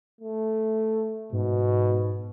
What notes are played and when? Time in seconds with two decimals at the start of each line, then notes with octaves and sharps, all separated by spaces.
0.21 A3
1.32 G#2 B2